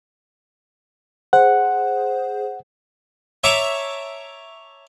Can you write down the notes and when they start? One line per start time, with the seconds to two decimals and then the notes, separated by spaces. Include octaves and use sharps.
1.33 G#4 C5 F#5
3.44 C#5 E5 A5 A#5 D6